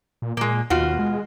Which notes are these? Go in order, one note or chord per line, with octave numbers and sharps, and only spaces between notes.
A#2
A#2 G#3 A#3
D#2 B2 F4 F#4
G#3